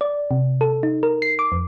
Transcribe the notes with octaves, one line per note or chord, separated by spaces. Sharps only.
D5
C3
A4
D#4
A#4
C7
D6
F2